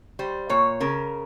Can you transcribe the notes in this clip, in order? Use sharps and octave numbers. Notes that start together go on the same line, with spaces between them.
G3 C5
A#2 C#5
C#3 A#4